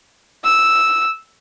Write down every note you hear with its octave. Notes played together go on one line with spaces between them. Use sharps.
E6